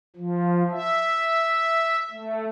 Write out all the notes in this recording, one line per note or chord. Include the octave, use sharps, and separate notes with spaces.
F3
E5
A3